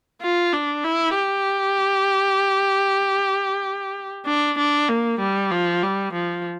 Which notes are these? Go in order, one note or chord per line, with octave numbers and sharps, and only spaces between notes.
F4
D4
E4
G4
D4
D4
A#3
G3
F3
G3
F3